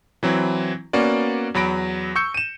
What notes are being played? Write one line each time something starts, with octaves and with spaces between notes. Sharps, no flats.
E3 F#3 C4 E4
A#3 B3 C#4 F#4 D5
E2 F#3 B5 A#6 D7
C#6 E6 G6 C#7
D#7 E7